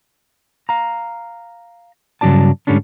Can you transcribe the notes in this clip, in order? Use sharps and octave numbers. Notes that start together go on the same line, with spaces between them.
F5 A#5
G2 C#3 F#3 D#4 D5 A5
G#2 D3 G3 C#4 D4